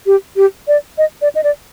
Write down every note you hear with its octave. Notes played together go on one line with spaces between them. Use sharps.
G4
G4
D5
D#5
D5
D#5
D5